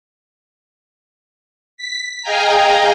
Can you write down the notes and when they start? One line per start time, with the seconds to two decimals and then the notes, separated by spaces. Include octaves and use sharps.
1.77 B6
2.22 G#4 D#5 F5 G5 G#5 A#5